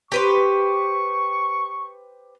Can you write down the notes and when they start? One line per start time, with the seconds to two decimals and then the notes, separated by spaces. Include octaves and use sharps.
0.12 G4 B4 C5 C#6